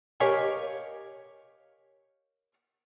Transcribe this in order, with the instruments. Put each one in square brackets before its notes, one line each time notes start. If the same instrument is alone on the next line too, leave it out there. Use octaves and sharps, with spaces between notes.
[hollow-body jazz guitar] G4 A#4 C#5 D#5 F5 G#5